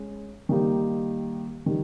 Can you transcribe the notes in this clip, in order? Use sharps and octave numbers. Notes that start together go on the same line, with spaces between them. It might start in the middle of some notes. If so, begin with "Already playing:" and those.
Already playing: G#3 C#4
D#3 G3 A#3 D#4 G4
D#3 G3